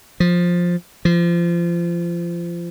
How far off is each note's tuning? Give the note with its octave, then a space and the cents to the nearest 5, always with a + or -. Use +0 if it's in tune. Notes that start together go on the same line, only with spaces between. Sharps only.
F3 +10
F3 -25